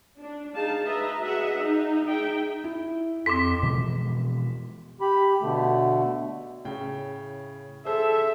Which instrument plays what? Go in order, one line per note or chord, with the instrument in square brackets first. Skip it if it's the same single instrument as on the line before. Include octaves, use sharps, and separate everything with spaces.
[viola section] D4
D#4 G#4 F5 A5
B4 D#5 E5 A#5
F#4 G#4 D#5 E5 F#5
D#4
D#4 G#4 E5 G5
[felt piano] E4
[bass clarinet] F2 [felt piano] A4 C6 [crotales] D6 B6
[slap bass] B2 E3 F3 G#3
[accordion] G4 B5
B2 D3 A3
[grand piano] A2 C#3 G5
[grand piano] G#4 C5 E6 [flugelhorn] A4 [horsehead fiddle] E5